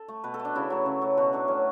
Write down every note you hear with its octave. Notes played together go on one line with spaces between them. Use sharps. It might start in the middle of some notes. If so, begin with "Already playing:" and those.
Already playing: A4
A3
B2 B4
A4
A3
D4
C#3 E4
F#3 A3
C#3
F#3 A3
B2 F#4
F#3 A3 D4
A2 C#4